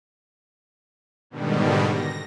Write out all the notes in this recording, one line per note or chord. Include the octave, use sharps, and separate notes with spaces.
G#2 B2 D3 D#3 G3
A#6